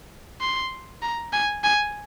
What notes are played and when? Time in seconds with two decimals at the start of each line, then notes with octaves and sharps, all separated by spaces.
0.41 C6
1.02 A#5
1.33 G#5
1.64 G#5